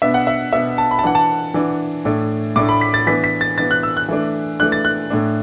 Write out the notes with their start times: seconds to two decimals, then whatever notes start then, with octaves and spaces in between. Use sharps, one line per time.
0.02 B2 B3 D4 E5
0.14 F#5
0.27 E5
0.52 B2 B3 D4 E5
0.78 A5
0.91 B5
0.99 A5
1.03 E3 D4 F#5
1.15 A5
1.54 E3 D4
2.05 A2 A3 D4
2.56 A2 A3 D4 D6
2.69 B5
2.81 B6
2.94 A6
3.07 E3 B3 D4 B6
3.24 B6
3.41 A6
3.58 E3 B3 D4 A6
3.71 F#6
3.83 E6
3.97 F#6
4.08 E3 A3 D4
4.60 E3 A3 D4 F#6
4.72 A6
4.85 F#6
5.10 A2 A3 D4